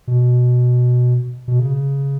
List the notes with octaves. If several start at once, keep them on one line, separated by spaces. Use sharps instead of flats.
B2
B2
C#3